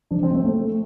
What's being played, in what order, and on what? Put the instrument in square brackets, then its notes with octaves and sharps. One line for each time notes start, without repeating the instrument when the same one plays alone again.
[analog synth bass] F3 [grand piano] D4
[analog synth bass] F3 [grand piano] C4
[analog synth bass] A3 [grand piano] C4
[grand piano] A3